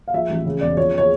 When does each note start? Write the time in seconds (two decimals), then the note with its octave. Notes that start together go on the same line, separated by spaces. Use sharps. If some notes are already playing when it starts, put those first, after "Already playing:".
0.08 F5
0.14 F3 E5
0.30 A1
0.45 C#3
0.61 E1 D5
0.77 F3 C#5
0.98 C#5